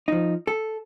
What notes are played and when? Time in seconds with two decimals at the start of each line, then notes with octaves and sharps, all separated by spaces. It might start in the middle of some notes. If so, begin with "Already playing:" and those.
0.08 F3 D#4
0.47 A4